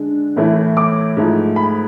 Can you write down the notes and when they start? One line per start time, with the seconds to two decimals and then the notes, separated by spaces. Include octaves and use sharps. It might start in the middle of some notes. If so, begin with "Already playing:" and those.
Already playing: D3 G#3 D4
0.36 A2 E3 A3 E4
0.77 D6
1.17 G#2 F3 A3 E4
1.56 B5